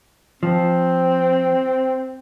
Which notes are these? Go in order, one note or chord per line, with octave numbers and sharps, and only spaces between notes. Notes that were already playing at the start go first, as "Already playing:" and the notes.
F3 C4